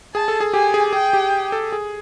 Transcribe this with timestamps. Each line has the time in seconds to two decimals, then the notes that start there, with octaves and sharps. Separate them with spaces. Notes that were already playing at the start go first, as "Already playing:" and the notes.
0.15 G#4 A5
0.28 A4
0.40 G#4
0.54 G4 G#5
0.74 G#4
0.93 G#4 G5
1.13 G4
1.52 A4
1.72 G#4